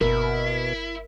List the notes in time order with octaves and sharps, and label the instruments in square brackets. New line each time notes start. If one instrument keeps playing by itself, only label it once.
[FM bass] G1 [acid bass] B2 [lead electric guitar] E4 [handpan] A#4